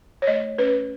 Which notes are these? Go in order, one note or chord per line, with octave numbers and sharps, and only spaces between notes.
C#5
A3 D#5
C#4 B4